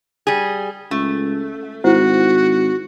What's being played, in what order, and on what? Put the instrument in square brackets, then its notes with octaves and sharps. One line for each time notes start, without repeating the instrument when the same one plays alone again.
[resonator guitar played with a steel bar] G3 G#4
[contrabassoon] C#2 [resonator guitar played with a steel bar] A3
[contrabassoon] G#1 [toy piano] E4 C5 F#5 [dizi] F#4